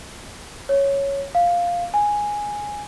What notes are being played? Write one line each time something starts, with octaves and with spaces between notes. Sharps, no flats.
C#5
F5
G#5